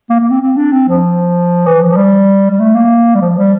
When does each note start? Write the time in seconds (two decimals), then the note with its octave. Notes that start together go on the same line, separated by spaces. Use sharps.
0.10 A#3
0.20 A#3
0.30 C4
0.42 C4
0.57 D4
0.72 C4
0.88 F3
1.66 E3
1.81 F3
1.92 F3
1.97 G3
2.51 G3
2.59 A3
2.75 A#3
3.15 G3
3.22 F3
3.37 G3